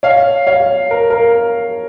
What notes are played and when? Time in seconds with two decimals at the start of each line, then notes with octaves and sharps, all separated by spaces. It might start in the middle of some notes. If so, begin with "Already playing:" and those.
0.03 C#5 F5
0.47 C#5 F5
0.91 A#4
1.10 A#4